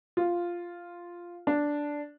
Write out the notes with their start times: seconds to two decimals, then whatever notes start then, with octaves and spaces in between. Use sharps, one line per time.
0.17 F4
1.47 D4